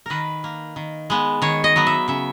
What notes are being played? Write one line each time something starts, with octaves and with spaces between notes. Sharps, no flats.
D#3 A#4 B4
A#3
D#3
G#3 B3
D#3 C#5
D#5
F#3 B3
E5
C#3 E5